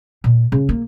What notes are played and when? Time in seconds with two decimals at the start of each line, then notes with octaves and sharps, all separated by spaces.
0.24 A#2
0.52 C#3
0.69 A#3